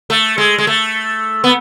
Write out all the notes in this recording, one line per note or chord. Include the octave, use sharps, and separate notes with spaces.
A3
G#3
G#3
A3
B3